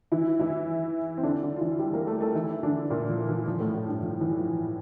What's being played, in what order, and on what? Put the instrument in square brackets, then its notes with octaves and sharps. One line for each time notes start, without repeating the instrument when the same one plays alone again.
[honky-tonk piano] E3 E4
E3 E4
C4
D3 D4
D3 D4
F4
E3 E4
G3 G4
A#3 A#4
A3 A4
A3 A4
E3 E4
D3 D4
A#2 A#3
F3
E3
F3
A2 A3
A2 A3
G2 G3
F3
E3
F3